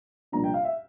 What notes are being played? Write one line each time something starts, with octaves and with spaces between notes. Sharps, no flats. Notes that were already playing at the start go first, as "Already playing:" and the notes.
C2 A#2 F3 A#3 D4 A#5
G5
F5
E5